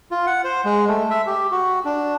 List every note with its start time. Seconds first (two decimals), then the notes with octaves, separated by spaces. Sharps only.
0.11 F4
0.26 F#5
0.44 C5
0.65 G#3
0.88 A3
1.11 E5
1.27 G4
1.52 F#4
1.85 D4